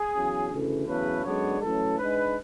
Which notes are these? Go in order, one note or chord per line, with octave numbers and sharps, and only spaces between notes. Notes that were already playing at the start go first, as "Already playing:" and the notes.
Already playing: G#4
E2 C#3 F#3
D2 C#3 E3 A4
E2 C#3 F#3 A3 B4
F#2 D3 G#3 B3 D4 C#5
F#2 E3 A3 C#4 A4
G#2 G#3 D4 B4